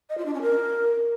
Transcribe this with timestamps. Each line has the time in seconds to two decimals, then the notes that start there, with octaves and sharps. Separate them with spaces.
0.10 D#5
0.18 F4
0.26 D4
0.34 C#4
0.42 A#4